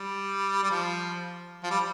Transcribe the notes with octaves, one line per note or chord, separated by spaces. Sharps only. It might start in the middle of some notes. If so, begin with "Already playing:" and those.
Already playing: G3
G3
F3
F3
G3